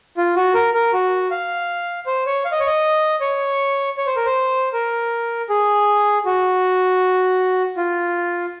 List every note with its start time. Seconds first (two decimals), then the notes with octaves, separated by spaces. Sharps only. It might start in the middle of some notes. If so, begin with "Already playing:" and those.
0.17 F4
0.36 F#4
0.54 A#4
0.74 A#4
0.93 F#4
1.31 F5
2.06 C5
2.26 C#5
2.45 F5
2.52 D#5
2.60 C#5
2.67 D#5
3.21 C#5
3.97 C#5
4.07 C5
4.16 A#4
4.25 C5
4.73 A#4
5.50 G#4
6.26 F#4
7.77 F4